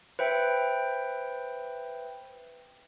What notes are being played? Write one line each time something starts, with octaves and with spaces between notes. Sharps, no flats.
B4 C5 E5 G5